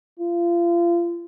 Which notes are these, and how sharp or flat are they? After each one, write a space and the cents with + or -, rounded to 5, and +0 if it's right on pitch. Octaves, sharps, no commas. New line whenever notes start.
F4 -30